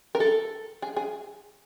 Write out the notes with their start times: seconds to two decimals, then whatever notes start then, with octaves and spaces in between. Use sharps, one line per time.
0.15 A#4
0.20 A4
0.82 G#4
0.96 G#4